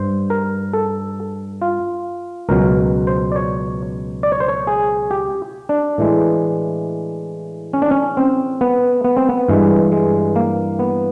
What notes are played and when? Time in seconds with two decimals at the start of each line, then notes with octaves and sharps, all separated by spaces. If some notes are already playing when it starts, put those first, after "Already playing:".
Already playing: G2 C5
0.30 A#4
0.74 A4
1.62 F4
2.49 C#2 B2 F#3 A#4
3.07 C5
3.32 D5
3.36 C#5
4.23 D5
4.32 C#5
4.40 C5
4.48 C#5
4.67 G#4
5.11 G4
5.69 D4
5.98 A2 E3 G#3
7.73 C#4
7.82 D4
7.91 C#4
8.17 C4
8.61 B3
9.04 B3
9.17 C4
9.29 B3
9.48 G2 E3 G#3
9.92 G#3
10.36 A#3
10.79 B3